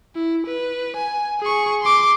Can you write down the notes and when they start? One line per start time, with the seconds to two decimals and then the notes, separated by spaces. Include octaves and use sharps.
0.15 E4
0.46 B4
0.96 G#5
1.41 G#4 C#6
1.82 C6 D6